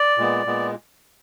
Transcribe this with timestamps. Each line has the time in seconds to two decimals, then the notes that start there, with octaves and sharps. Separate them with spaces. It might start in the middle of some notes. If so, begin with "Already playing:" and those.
Already playing: D5
0.18 A#2 G#3 B3
0.46 A#2 G#3 B3